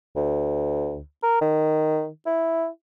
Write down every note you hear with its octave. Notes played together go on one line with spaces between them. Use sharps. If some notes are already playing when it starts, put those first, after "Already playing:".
D2
A#4
D#3
E4